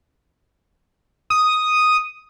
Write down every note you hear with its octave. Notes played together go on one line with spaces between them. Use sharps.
D#6